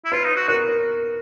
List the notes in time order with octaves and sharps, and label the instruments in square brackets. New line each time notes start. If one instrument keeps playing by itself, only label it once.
[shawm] E4
[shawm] F4 [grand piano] B4
[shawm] D#4
F#4
[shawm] F#4 [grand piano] A#4